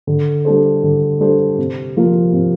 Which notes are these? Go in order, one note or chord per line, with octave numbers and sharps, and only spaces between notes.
D3
G3 D4 A4 C5
D3
G3 D4 A4 C5
C3
F3 A#3 F4 A#4
C3